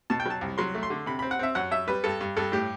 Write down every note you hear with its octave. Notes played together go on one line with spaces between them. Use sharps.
B2 A5
G5
F#3 A5
C2
F#3 C6
A3
C6
D3
C3 B5
C4 B5
F#5
C4 E5
F#2 F#5
F#2 E5
G3 B4
G2 A4
G2
G2 A4
A2 G4